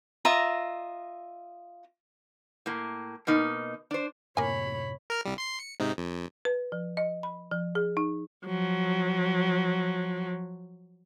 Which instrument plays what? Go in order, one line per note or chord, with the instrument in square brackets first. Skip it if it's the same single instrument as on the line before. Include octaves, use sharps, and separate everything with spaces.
[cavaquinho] F4 D#5 E5 A#5
[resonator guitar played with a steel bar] A2 A#3
B2 A#3 D#4
D4 C5
[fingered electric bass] F#2 A2 C3 [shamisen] A#3 G#5 [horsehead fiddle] C#5 B5
[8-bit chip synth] A#4 F6
C2 G3
C6 C7
C#7
G#2 C3 D#4
F2
[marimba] B4
F3
D#5
B5
F3
G#4
D#4
[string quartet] F3 F#3